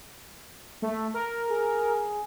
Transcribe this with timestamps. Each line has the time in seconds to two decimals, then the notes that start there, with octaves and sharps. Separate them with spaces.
0.82 A3
1.14 A#4
1.49 G#4